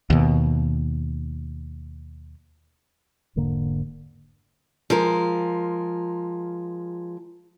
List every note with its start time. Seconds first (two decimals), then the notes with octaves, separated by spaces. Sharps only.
0.10 D#2 B2
3.36 E1 G#2 D3 A#3
4.90 F3 G#3 A#4